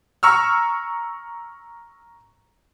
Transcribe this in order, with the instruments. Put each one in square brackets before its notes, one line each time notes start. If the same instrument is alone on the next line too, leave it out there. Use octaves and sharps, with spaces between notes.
[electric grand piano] A#5 C#6 E6 F6